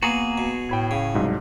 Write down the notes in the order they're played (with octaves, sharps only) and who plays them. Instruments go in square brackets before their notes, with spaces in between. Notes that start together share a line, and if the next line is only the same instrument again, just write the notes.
[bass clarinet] A#3 [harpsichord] B3 [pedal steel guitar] F#4 G#4 [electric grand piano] A#5
[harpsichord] B2
[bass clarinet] A2 [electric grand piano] G5 B5 G#6
[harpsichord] C#3
[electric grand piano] C2 G#2 F#3